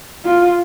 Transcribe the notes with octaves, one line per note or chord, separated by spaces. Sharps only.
F4